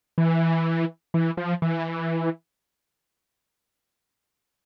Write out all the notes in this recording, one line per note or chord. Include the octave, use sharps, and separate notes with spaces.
E3
E3
F3
E3